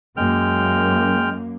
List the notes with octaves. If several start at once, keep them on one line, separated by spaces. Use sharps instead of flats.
F#2 G#3 A#3 G5 F6